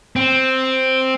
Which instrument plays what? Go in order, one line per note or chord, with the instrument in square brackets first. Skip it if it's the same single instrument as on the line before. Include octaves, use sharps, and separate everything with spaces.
[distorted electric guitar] C4